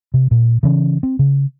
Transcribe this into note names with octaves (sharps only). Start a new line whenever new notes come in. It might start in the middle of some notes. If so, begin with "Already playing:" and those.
C3
A#2
C#3 E3 C#4
C4
C#3